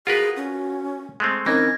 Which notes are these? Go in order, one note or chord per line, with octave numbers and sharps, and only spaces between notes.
F4 F#4 G#4 A#4 B4
C#4
G#3 A3 C4
E3 C4 C#4 D#4 A#4 G#6 A#6